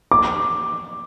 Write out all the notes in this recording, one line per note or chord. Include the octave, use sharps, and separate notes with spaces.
D6